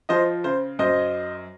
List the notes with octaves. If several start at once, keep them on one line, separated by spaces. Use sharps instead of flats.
F3 C5 D#5
C#3 C5
F#2 C5 D#5